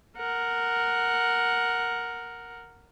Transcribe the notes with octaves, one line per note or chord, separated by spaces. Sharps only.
A#4 F#5